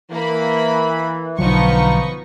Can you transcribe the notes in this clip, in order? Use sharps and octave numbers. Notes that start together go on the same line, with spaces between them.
E3 A#3 B5
B1 D3 F3 F#3 B3 D#4 C#6